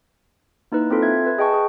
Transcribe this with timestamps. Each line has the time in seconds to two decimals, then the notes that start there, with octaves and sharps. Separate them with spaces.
0.72 A#3 D#4 E4 B4
0.90 C4 F4 A4 C6
1.03 E5 G#6
1.26 B4
1.38 G#4 D#5 G5 A5 C#6
1.54 G#4